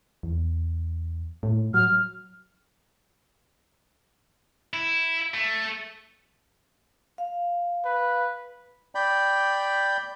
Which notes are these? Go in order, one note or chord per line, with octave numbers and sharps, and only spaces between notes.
E2
A2
F#3 F6
E4
A3
F5
B4
D5 G5 B5 G6